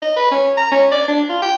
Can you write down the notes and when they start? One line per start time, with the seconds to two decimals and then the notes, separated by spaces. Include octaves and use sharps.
0.02 D#5
0.16 B4
0.31 C#4
0.57 A#5
0.72 C#4
0.92 D5
1.08 D4
1.30 F4
1.42 G5